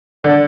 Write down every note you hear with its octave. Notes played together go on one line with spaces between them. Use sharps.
D3 D5